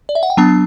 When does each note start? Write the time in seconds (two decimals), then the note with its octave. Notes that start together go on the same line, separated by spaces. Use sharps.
0.09 D5
0.15 E5
0.23 F#5
0.30 G5
0.37 F#3 B3 D4 A5